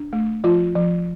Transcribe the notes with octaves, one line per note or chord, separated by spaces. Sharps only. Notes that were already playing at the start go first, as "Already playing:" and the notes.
Already playing: D4
A3
F3 F4
F3